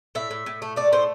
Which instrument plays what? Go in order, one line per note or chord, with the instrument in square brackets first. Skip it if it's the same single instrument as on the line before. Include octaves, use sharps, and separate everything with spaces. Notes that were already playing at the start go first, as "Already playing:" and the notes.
[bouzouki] A2 E5
A2
A2
A3
A3 D5
A2 C5